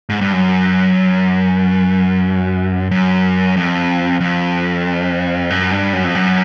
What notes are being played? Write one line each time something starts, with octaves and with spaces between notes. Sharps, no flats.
G#2
G2
F#2
F#2
F2
F2
F#2
G2
F#2
F2
F#2